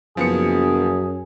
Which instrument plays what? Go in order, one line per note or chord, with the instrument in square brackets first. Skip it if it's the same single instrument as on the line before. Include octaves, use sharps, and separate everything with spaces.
[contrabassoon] F#1 [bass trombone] F#2 [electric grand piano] F3 B3 C#7 [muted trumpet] G#4